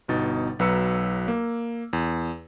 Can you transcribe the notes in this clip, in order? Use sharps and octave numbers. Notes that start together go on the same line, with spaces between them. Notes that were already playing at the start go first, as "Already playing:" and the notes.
G1 B2 D#4 A6
B1 F#3 B4 A#5 E6 C#7
A#3
E2